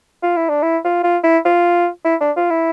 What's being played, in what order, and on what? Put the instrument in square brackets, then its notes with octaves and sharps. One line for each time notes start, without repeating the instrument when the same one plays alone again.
[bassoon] F4
E4
D4
E4
F4
F4
E4
F4
E4
D4
F4
E4